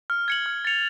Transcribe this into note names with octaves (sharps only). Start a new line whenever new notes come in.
F6
G#6 C#7 F#7
F6
A6 C#7 F7